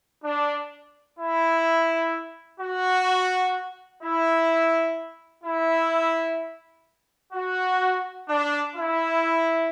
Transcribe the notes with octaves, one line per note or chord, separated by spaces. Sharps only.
D4
E4
F#4
E4
E4
F#4
D4
E4